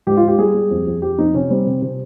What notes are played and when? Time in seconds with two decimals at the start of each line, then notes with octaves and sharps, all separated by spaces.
0.07 G#2 G4
0.17 F4
0.23 G#2
0.28 G4
0.38 G3 G#4
0.54 G3
0.71 F2
0.86 F2
1.02 F2 G4
1.18 F2 D#4
1.34 C3 C#4
1.50 G3 C4
1.66 C3
1.82 C3